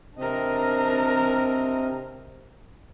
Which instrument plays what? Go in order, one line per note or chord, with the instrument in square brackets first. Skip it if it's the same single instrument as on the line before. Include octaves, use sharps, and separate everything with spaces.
[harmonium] C3 C4 D#5 [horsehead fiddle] D4 A#4